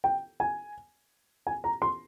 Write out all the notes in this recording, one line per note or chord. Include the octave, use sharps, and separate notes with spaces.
G5
G#5
G#5
A#5
C6